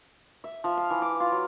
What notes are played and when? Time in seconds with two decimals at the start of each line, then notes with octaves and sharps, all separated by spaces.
0.44 E5
0.64 F3
0.77 F5
0.90 E3
1.02 D6
1.20 F4
1.32 F#3